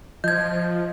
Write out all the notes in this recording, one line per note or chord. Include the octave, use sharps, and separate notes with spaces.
F3 D#5 G6 G#6